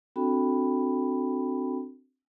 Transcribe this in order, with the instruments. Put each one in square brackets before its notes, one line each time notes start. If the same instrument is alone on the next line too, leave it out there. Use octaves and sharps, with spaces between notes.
[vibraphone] C4 D4 F#4 A4 G5 B5